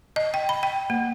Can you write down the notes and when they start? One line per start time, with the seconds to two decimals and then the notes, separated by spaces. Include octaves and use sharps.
0.16 D#5
0.34 G5
0.49 B5
0.63 G5
0.90 A#3